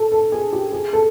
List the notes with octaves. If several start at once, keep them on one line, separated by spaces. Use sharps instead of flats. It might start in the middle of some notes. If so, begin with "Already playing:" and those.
Already playing: A4
A4
G#4
G4
G#4
A4